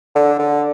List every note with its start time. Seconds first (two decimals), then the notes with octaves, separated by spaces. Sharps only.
0.15 D3
0.39 D3